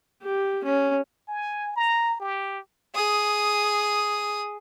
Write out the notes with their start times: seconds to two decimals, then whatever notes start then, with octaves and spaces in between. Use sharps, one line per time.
0.23 G4
0.64 C#4
1.28 G#5
1.76 A#5
2.20 G4
2.95 G#4 D#6